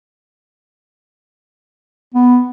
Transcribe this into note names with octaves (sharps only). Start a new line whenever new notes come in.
B3